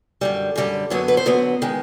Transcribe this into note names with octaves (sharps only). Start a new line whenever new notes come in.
F#2 D3 G3
F#2 D3 G3
F#2 D3 F#3 B3 C#5
B4
C5
F#2 D3 F#3 B3
D#3 G#3